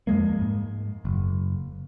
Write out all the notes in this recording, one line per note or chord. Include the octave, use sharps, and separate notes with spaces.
F2 F3 G#3 A#3
G#2
F#1